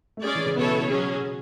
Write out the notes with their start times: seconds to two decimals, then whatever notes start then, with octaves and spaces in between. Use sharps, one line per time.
0.17 A3
0.24 G#3 C#4 G#4 D5
0.35 E3
0.45 C#3
0.56 B2 B3 E4 A4 C#5
0.72 B2
0.88 F#3 C#4 G#4
1.20 C#3